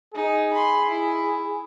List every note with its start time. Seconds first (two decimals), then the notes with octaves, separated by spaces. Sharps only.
0.14 D#4 G#4
0.53 B5 C6
0.88 E4